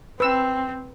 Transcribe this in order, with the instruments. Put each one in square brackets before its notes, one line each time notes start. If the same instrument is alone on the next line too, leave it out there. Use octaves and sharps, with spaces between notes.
[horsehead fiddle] C4 [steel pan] B4 E6